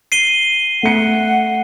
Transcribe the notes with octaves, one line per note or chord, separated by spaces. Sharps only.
C7 D#7 G7
A3 F#5 C#7